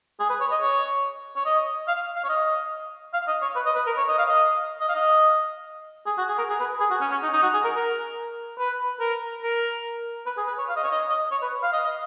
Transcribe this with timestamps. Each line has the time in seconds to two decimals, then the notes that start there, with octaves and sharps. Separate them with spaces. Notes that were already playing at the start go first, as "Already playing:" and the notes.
0.20 G#4
0.29 B4
0.40 C#5
0.51 D#5
0.61 C#5
1.36 C#5
1.45 D#5
1.88 F5
2.16 F5
2.24 C#5
2.29 D#5
3.13 F5
3.27 D#5
3.42 C#5
3.56 B4
3.66 D#5
3.76 B4
3.87 A#4
3.97 C#5
4.08 D#5
4.18 F5
4.29 D#5
4.80 D#5
4.89 F5
4.95 D#5
6.06 G#4
6.18 F#4
6.28 G#4
6.38 A#4
6.49 G#4
6.60 B4
6.80 G#4
6.91 F#4
7.01 C#4
7.11 C#4
7.23 D#4
7.33 D#4
7.43 F#4
7.53 G#4
7.64 A#4
7.75 A#4
8.59 B4
9.00 A#4
9.43 A#4
10.26 B4
10.37 G#4
10.47 B4
10.58 C#5
10.69 F5
10.76 D#5
10.84 C#5
10.91 D#5
11.10 D#5
11.31 C#5
11.42 B4
11.63 F5
11.73 D#5
11.84 D#5